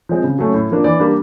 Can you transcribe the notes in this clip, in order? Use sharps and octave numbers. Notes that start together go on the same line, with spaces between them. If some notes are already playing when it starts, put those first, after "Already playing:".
F3 G#3 C4
C#3
F#3 A3 C#4
A2
F3 A#3 D4
E3 D5
G3 A#3 D4